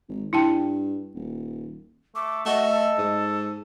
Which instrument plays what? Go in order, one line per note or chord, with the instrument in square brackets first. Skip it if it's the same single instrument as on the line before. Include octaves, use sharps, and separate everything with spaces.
[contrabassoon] G#1
[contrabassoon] G2 [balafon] E4 G5 A5
[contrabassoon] D#1
[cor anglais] A3 [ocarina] D6
[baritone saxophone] A3 [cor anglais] F#4 [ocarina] D#5
[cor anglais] A4
[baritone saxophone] G#2